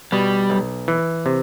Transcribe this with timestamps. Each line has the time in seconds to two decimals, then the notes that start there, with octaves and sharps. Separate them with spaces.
0.12 B2 G3
0.50 B1
0.88 E3
1.26 C3